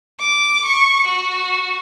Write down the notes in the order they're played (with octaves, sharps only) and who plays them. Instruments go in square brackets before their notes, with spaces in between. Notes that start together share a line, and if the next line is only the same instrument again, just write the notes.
[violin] D6
C#6
F#4